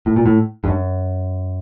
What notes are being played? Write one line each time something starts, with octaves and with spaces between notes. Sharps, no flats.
A2
A#2
A2
G2
F#2